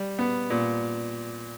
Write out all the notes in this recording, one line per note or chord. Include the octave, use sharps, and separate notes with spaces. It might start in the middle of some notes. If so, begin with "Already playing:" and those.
Already playing: G3
B3
A#2